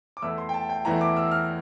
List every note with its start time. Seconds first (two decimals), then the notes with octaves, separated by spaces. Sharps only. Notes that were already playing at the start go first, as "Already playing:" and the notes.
0.17 D6
0.22 E2 E3 A3 E4 E6
0.38 C6
0.49 G5
0.54 A5
0.69 G5
0.85 E2 E3 A3 E4 A#5
1.01 D6
1.17 E6
1.31 F6